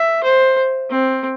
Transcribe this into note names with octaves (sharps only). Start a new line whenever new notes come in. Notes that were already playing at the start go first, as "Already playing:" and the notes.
Already playing: E5
C5
C4